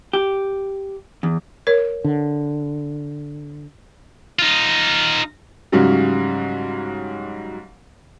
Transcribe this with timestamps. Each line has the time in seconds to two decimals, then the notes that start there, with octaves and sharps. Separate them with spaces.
0.13 G4
1.23 E2
1.67 A#4 C#5
2.04 D3
4.39 D#4 F4
5.72 G#2 C#3 F#3 G3